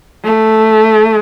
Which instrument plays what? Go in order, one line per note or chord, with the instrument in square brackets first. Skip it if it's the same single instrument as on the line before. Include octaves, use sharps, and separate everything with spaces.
[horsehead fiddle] A3